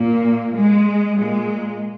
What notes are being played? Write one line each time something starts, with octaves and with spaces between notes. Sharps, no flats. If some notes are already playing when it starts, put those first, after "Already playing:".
Already playing: A#2 A#3
G#3
A#2 G#3